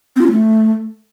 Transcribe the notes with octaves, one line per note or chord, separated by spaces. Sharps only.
C4
F4
C#4
A3